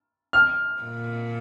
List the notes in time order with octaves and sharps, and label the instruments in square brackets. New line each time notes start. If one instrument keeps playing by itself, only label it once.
[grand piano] F6
[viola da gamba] A#2